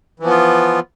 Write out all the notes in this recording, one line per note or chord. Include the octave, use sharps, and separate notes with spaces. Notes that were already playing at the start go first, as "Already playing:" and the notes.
E3 F3 B3 F4